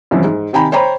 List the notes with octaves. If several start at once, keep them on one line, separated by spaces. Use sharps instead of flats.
C2 F#2 E3 F3
G#2
C3 D#3 G5 G#5 A#5 B5
C5 C#5 G5 A#5 B5